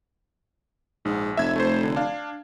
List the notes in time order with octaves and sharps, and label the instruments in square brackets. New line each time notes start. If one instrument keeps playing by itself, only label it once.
[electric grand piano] A#1 [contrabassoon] G#2
[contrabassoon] F1 [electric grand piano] E5 G#6
[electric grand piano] A3 C5
D3
D4 F5